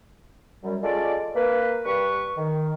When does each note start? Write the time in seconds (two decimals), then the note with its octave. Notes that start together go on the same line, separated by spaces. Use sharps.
0.63 F#2 G3
0.82 G#3 C#4 F4 A4 D5
1.35 A#3 B4
1.85 G2 G3 B4 C#6
2.37 D#3